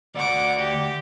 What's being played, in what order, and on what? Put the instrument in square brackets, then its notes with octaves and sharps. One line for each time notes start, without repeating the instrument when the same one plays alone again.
[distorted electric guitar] D2 D5 [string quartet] F#5 D6
[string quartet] G4